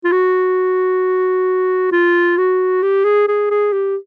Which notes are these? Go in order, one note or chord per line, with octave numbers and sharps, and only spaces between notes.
F4
F#4
F4
F#4
G4
G#4
G#4
G#4
G4